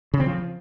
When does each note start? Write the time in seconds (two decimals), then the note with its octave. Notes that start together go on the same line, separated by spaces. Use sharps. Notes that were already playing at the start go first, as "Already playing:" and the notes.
0.14 C#3
0.20 C4
0.26 F3